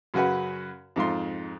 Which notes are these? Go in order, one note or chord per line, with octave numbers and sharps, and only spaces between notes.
F#2 C#3 F#4 B4 F#5
F2 G#2 F4 C6